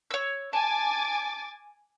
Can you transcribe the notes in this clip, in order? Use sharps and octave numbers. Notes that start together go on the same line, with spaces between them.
C#5 E6
G#5 A5 D6 A6